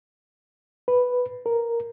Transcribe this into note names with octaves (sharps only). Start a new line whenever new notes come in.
B4
A#4